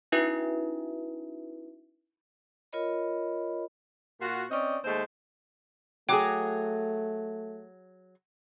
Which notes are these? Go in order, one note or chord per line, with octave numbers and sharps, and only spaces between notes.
C#4 D#4 E4 F#4 B4 E5
F4 A#4 C#5 D#5 B5
A#2 F4 F#4
C4 C#4 D5 D#5
D#2 G#3 A3 C5
F#3 A3 G#4 G5 D6